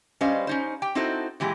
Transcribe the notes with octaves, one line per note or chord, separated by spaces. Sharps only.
G3 C#4 B4 C5 D#5 F5
C#4 D#4 C5
G4 G5
C4 D#4 E4 F#4 A4 C5
A#2 E3 G#3 G4